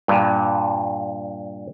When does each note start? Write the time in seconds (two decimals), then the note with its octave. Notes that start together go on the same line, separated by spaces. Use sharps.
0.08 G2 A#2